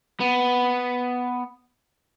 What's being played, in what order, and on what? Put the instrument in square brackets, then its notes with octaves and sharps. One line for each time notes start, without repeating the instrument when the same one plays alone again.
[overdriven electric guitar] B3